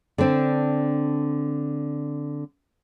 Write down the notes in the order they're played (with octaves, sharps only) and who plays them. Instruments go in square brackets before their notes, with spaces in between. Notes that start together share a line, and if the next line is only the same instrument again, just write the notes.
[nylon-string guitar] D3 C4 D4